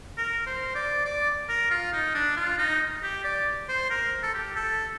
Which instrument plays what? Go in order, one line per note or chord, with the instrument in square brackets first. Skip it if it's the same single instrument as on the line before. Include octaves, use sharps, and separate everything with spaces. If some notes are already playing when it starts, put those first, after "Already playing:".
[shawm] A#4
C5
D5
D5
A#4
F4
D#4
D4
F4
D#4
G4
D5
C5
A#4
A4
G4
A4